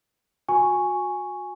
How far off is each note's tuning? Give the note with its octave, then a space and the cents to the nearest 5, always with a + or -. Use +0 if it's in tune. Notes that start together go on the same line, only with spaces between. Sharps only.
F#4 -30 G#5 +0 C#6 +0